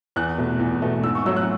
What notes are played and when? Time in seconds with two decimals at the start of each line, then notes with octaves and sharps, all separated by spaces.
0.16 E2 F#6
0.38 B2 A3
0.59 E2
0.82 B2 A3
1.04 G#2 E6
1.15 C#6
1.26 F#3 A3 E6
1.36 F#6